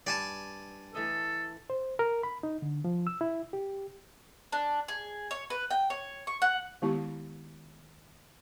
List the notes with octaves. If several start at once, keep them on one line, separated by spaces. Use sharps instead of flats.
G2 D5 G#5 A5
E3 A3 A4 D#5
C5
A#4
B5
D#4
D3
F3
E6
E4
G4
D4
G#4
C#5
B4
G5
C#5
C#6
F#5
D#3 G#3 B3 E4 G4 C#6